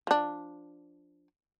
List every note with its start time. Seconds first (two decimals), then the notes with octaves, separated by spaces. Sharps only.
0.07 F3 D4